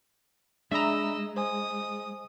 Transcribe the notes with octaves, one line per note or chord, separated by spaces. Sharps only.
G#3 D4 D#5 E5 A#5 B5 E6
C5 G#5 D#6